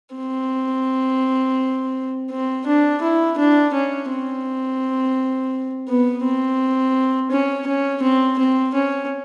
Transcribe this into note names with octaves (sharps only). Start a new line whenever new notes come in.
C4
C4
D4
E4
D4
C#4
C4
B3
C4
C#4
C#4
C4
C4
C#4